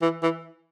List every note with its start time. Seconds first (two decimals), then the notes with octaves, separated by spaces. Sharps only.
0.02 E3
0.22 E3